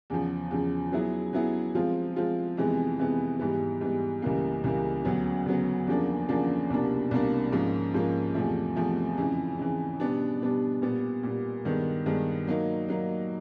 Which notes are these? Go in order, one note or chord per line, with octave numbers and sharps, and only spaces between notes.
E2 C#3 F3
E2 C#3 F3
F#3 B3 E4 G#4
F#3 B3 E4 G#4
F3 G#3 C4 F4
F3 G#3 C4 F4
F2 C3 E3 G#3 B3
F2 C3 E3 G#3 B3
G#2 E3 G3 B3
G#2 E3 G3 B3
C#2 C#3 E3 G3 A#3
C#2 C#3 E3 G3 A#3
D2 C#3 F#3 B3
D2 C#3 F#3 B3
E2 C#3 F3 A#3 D4
E2 C#3 F3 A#3 D4
C2 B2 G3 A#3 D4
C2 B2 G3 A#3 D4
G#2 F3 A#3 C#4
G#2 F3 A#3 C#4
E2 C3 F3 A3
E2 C3 F3 A3
F2 C#3 E3
F2 C#3 E3
B2 G3 B3 D4
B2 G3 B3 D4
A#2 G3 B3
A#2 G3 B3
G2 D#3 G#3 B3
G2 D#3 G#3 B3
F#3 A#3 D#4
F#3 A#3 D#4